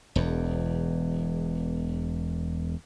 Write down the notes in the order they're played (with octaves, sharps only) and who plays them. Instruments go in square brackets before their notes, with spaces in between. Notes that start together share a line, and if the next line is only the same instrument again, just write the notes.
[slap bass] E1 E2